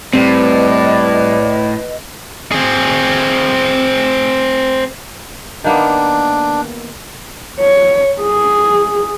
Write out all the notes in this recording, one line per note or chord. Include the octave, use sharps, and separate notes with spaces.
A2 G3 C4 B4 D5 D#5
C4 G#4
D#3 A#3 B3 D4
C#5
G#4